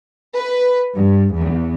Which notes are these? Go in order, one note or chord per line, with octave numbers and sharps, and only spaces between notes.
B4
G2
E2